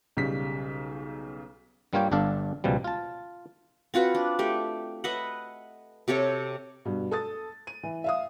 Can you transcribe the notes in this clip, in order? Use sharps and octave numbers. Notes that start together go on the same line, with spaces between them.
B1 C#3 G3 B6
G2 G3 A#3 F4 C#5 G5
G1 G2 D4 A4 F5
C#2 B2 F3 G3
F4 A5
C4 F4 F#4 B4
D4
A3 G4
B4 D#5 E5 F#5
C3 G4 A4 C#5
G2 B2
A4 D#6 A6
D#7
E3
E5 F5 D#6